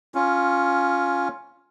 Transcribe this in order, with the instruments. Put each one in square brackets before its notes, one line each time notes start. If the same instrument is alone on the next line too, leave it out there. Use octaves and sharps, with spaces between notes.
[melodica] C#4 F4